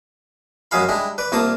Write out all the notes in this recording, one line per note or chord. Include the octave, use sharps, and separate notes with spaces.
F#2 F#3 G#3 G#4 F5 B5
G3 G#3 D4 E4
B4 D5
C2 A#3 F4 D5 A5 D#6